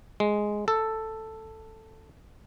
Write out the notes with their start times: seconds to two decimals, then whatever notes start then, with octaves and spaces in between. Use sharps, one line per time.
0.20 G#3
0.68 A4